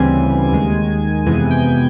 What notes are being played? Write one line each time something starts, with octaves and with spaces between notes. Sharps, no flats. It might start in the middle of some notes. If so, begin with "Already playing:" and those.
Already playing: D2 C#3 E3 G3 C4 G#5
D#2 D#3 G#3
F2 C3 E3 G#3 B3 G#5
G5
G5